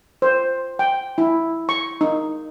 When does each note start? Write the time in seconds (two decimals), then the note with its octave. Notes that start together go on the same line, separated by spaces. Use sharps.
0.22 C5
0.79 G5
1.18 E4
1.69 C#6
2.01 D#4